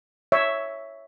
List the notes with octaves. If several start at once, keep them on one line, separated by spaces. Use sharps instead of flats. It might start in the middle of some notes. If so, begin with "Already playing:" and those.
C#5 E5